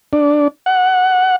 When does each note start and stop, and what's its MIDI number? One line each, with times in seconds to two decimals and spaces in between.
0.13 0.48 62
0.66 1.36 78